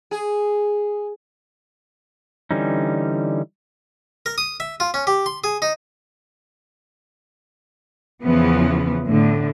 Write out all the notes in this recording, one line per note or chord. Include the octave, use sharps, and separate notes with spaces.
G#4
D3 E3 G3 C#4 D#4
A#4
D#6
E5
F4
C#4
G4
C6
G#4
D#4
E2 C#3 E3 F3 B3
A2 D3